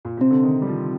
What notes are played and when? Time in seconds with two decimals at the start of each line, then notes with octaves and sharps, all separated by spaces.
0.05 A#2
0.17 C3 C4
0.31 D3
0.43 D#3
0.62 G3
0.67 F3